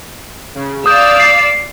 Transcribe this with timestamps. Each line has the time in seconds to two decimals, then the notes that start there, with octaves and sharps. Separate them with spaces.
0.55 C#3
0.86 D5 F5 D#6 E6 G6
1.20 C7